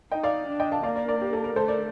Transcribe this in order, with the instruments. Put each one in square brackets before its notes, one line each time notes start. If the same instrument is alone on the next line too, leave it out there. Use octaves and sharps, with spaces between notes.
[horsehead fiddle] D#4 [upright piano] D#5 G5
[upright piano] D5 F5
[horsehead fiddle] D4
[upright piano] D#5 G5
F5 A5
[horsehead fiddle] A#3 [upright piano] D5 F5
[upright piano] A#4 D5
A#4 D5
G4
A4
A#4
[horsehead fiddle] A3 [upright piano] A4 C5
[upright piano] A#4 D5